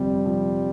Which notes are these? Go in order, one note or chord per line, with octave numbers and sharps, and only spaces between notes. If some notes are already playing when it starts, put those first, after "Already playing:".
Already playing: G1 F2 C3 F3 G3 C4
C3 F3